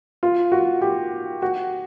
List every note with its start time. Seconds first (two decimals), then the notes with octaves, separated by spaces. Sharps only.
0.23 F4
0.52 F#4
0.82 G4
1.42 F#4